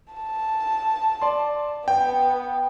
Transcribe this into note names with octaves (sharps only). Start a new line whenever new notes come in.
A5
D5 C6
B3 G5